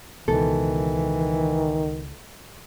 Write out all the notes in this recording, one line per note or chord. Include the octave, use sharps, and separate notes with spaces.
C#2 B2 D#3 E3 A4